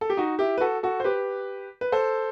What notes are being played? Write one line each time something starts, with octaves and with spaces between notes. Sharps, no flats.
A4
G4
D#4 F#4
E4 G4
B4
F#4 A4
F#4 A4
C5
G4 B4
B4
A4 C5